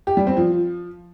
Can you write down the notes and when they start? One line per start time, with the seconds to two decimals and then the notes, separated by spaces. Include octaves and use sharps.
0.07 G4
0.17 G3
0.27 C4
0.37 F3